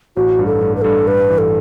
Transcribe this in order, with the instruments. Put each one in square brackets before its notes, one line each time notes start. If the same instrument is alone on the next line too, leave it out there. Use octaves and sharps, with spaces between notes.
[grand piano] A1 [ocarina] F#4
[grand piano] G2
[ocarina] A4
[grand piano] G2
[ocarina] B4
[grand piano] G2 [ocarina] A4
[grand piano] G2 [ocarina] B4
[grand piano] E3
[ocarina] A4